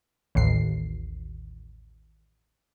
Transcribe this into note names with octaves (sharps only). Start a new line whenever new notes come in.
A1 D#2 C7